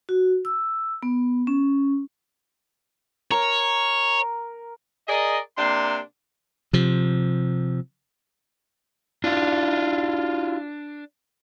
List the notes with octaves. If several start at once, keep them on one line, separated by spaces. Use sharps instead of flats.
F#4
E6
B3
C#4
A#4 C#5
G#4 A#4 D5 D#5
C3 A#3 D4 C6
C3 F3
D4 E4 F4